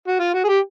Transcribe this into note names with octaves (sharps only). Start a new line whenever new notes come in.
F#4
F4
F#4
G#4
G4